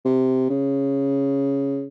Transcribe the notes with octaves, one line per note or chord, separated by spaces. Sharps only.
C3
C#3